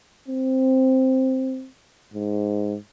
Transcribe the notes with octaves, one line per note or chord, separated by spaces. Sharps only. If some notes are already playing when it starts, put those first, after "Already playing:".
C4
G#2